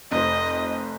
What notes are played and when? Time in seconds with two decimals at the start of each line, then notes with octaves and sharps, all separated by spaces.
0.12 F1 C5 D#5